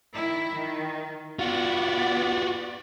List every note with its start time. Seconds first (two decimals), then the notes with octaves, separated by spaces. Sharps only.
0.13 D#3 E4
0.53 D#3
1.39 B3 F4 F#4 D5